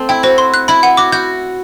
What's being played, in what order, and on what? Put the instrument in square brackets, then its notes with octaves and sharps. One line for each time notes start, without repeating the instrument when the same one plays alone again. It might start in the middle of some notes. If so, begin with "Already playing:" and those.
Already playing: [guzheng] A3 C4
[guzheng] E4 [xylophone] G5
[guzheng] F#4 [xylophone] C5
[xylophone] C6
F#6
[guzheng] E4 [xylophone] B5
[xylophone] F#5
[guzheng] F#4 [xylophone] D6
[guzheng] F#4 [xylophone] G6